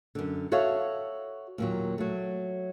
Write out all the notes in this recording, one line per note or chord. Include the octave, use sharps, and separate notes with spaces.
F#2 D3
F#4 A4 C#5 E5 F5
D#2 A#2 F#3
F#3 A3